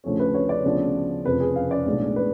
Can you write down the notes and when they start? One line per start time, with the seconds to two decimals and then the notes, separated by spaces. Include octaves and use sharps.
0.04 D2 C#3 F3 A3 C#4
0.19 B4
0.34 C#5
0.49 D5
0.65 D2 C#3 F3 B3 D4
1.25 F1 F2 C#3 F3 B4
1.40 G#4
1.56 F5
1.71 D5
1.86 B1 A2 G#3 D4
2.16 B4